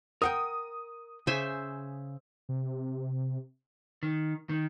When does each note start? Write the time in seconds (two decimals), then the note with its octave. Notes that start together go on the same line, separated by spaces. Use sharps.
0.22 A#4 F#5 G5 D#6
1.27 C#3 C5 E5 G#5
2.49 C3
4.03 D#3
4.49 D#3